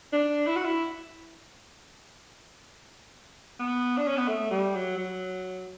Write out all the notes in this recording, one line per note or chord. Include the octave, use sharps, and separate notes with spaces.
D4
E4
F#4
E4
B3
D4
C#4
B3
A3
G3
F#3
F#3